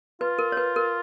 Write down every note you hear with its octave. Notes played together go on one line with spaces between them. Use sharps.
F4 B4
A#4
C#5
B4
A#4